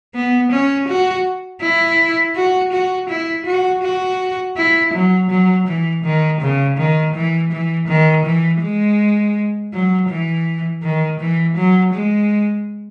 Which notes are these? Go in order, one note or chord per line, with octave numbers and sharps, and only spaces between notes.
B3
C#4
F#4
E4
F#4
F#4
E4
F#4
F#4
E4
F#3
F#3
E3
D#3
C#3
D#3
E3
E3
D#3
E3
G#3
F#3
E3
D#3
E3
F#3
G#3